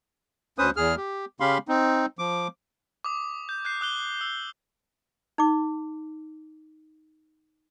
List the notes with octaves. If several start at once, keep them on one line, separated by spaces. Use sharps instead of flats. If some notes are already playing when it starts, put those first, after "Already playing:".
D2 C#4 B4 C5 D#6
E2 G#4 F6
G4
C#3 C#4 G4 F5 B5 C6
C4 D#4
F3 D6
D6 D#6
G6
F#6 G6 C7
D#6 F#6 G7
E6
D#4 D6